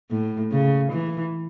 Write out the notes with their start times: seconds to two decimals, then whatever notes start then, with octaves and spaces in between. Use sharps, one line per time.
0.11 A2
0.52 C#3
0.92 E3